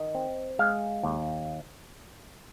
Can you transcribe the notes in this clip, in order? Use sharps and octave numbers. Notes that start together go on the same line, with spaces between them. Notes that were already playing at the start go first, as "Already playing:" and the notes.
Already playing: D#3 D#5
C4
G#3 F5
D#2